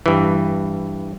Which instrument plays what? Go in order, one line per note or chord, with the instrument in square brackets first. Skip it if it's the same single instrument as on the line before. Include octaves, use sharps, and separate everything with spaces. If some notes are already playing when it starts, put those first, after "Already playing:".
[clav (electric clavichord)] G2 E3